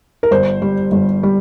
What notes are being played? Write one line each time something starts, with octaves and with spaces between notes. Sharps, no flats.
A#4
G1 C5
G3
G1
G3